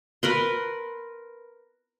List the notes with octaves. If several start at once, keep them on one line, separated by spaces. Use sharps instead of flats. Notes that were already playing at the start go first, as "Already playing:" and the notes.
A#4 B4 C6